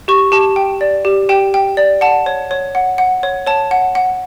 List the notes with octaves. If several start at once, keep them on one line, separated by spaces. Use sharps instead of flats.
G4 C#6
G4 A5
G5
D5
G4
G4 G5
G5
D5
F#5 A5
C#5
C#5
F#5
F#5
C#5
C#5 A5
F#5
F#5